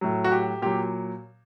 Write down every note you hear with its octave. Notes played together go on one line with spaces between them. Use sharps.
A2 F#3
F#4
G4
A#2 F#3 G4